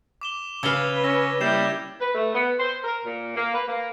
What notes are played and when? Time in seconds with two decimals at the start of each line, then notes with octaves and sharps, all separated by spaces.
0.21 D6 E7 G7
0.63 C#3 B4 F5 E6 G#6 G7
1.04 C#4 E6 A#6
1.41 G3 A#3 E4 G6 C7 E7
2.00 B4
2.14 A3
2.33 B3
2.58 C5
2.83 A#4
3.04 A#2
3.35 A#3
3.54 B4
3.67 A#3